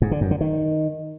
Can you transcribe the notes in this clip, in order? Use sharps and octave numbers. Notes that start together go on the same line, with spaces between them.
G#2
D3
F#2
D3
D#3